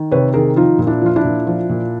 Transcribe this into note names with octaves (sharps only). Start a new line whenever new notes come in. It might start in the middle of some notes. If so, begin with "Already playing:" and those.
Already playing: D#3
C3 B4 C#5
D#3 G#4 A#4
F3 D#4 F4
A#2
D4 E4
F3 F4
D4 E4
A#2
F3
A#2